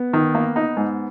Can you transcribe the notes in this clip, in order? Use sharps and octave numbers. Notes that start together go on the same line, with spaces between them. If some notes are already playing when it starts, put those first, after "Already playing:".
Already playing: B3
D#3
A#3
D#4
G#2